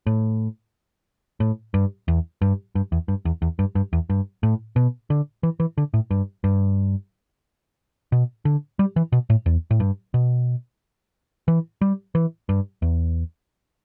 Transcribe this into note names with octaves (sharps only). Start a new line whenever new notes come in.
A2
A2
G2
E2
G2
G2
E2
G2
E2
E2
G2
G2
E2
G2
A2
B2
D3
E3
E3
D3
A2
G2
G2
B2
D3
G3
E3
B2
A2
E2
A2
G2
B2
E3
G3
E3
G2
E2